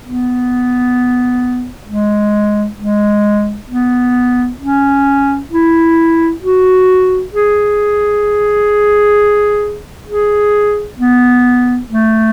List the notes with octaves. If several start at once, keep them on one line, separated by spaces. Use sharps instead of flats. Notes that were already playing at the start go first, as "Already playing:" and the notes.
B3
G#3
G#3
B3
C#4
E4
F#4
G#4
G#4
B3
A3